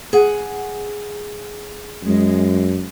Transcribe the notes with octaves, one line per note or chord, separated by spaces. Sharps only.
G#4 F#5
F#2 G#3